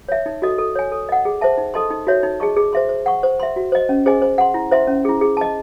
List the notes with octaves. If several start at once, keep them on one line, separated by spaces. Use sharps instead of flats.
C#5 E5
D#4
F#4 A4 D#5
A4
C#5 G#5
A4
D#5 F#5
G#4
C5 E5 A5
D#4
A4 D#5 A5 C6
D#4
F#4 C#5 E5
D#4
G#4 D#5 A5 C#6
G#4
C5 E5 C6
C5
F#5 C#6
C5
E5 C6
F#4
C5 D#5
C#4
G#4 C5 D#5 G#5
C5
F#5 C6
E4
C5 E5 C6
C#4
E4 G#4
G#4
D#5 A5